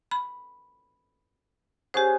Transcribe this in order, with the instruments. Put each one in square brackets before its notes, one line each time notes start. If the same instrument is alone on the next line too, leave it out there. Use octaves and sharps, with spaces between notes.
[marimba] B5
[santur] C#4 G#4 F#5 [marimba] G4 C5